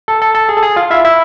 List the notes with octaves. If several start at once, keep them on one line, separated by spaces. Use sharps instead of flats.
A4
A4
A4
G#4
A4
G#4
F4 F5
E4 E5
E4 E5